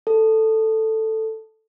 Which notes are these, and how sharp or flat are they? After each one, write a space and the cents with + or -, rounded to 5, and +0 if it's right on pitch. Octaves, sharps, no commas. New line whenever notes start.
A4 +5